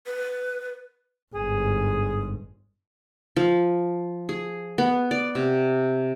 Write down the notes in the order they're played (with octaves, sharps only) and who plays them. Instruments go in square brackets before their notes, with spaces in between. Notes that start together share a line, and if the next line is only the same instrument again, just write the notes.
[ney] B4
[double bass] G1 G#2 [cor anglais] G#4
[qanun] F3
G#4
B3
D5
C3